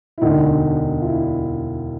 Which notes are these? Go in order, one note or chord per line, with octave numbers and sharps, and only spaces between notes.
E4
E1 D2 D3 D#4
F4
E4